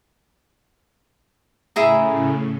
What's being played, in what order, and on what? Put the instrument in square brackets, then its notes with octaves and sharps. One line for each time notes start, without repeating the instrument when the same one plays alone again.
[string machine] A2 C#3 [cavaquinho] E4 G#4 A#5